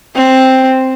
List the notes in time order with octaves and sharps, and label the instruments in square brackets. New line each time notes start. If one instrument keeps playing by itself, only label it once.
[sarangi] C4